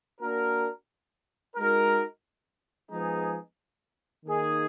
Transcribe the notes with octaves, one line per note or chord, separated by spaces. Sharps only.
A#3 D4 F#4 A#4
G#3 D#4 F#4 A#4
F3 G#3 B3 D#4 G#4
D#3 A#3 D#4 G#4